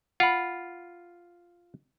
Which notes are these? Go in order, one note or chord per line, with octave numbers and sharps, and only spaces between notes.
F4 F#5 B5